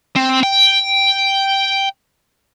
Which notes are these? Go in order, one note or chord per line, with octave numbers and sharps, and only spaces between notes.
C4
G5